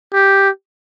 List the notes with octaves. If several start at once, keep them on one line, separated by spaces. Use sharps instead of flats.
G4